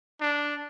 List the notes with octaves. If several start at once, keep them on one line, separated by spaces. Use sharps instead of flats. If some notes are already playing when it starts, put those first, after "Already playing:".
D4